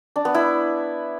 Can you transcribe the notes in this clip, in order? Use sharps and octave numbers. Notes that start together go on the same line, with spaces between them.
D4
B3
E4